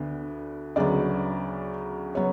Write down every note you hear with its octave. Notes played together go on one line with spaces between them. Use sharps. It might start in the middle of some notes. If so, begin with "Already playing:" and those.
Already playing: D2 D3 B3
D2 C#3 F#3 B3 D5
C#3 F#3 B3 C#5